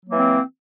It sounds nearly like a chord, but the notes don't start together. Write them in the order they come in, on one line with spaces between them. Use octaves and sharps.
F#3 A#3 E3 C4